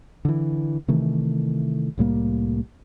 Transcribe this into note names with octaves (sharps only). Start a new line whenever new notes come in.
D3 E3
C3 D#3 E3 A3
C2 A2 G3 A#3